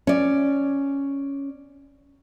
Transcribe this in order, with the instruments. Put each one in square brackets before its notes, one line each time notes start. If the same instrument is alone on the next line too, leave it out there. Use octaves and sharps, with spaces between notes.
[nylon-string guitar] C#4 D5